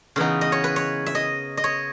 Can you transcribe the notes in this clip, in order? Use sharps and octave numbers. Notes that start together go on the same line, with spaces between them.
C#3 E3 B3 D#4
D#5
C#5
B4
C#5
E5
D#5
D#5
C#5